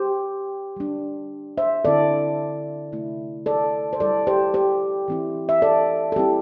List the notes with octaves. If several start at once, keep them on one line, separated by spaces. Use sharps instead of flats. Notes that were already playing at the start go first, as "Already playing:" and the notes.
Already playing: G4 C5
G3 D4
C5 E5
D3 C4 E4 A4 D5
C3 A3 E4
A4 D5
C5
G3 E4 A4 D5
G4 C5
G4 C5
E3 C4 E4
E5
A4 D5
A4
G3 C4 E4 G4